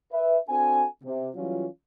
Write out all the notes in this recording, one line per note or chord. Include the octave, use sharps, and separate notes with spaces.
B4 E5
C4 D4 F#4 A4 G#5
C3
E3 F#3 G3 C#4 F4